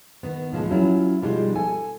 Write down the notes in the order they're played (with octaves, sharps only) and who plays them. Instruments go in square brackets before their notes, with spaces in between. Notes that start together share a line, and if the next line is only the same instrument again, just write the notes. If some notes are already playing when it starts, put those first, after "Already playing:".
[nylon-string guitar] D#3 B3
A2 F3 F#3 G#3
F#3 C#4 E4 F4
B2 F3 G3 G#3 D#4 F4
A4 G#5